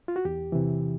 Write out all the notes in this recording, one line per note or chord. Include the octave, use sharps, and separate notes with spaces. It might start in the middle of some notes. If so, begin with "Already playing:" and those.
F4
F#4
E2 G4
C3 E3